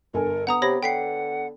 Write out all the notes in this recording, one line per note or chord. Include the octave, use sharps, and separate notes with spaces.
G1 A4 A#4 G#5
B3 F#5 A#5 D#6
C3 G4 C#5 B5 A#6
D3 F#5 G5 B6 C7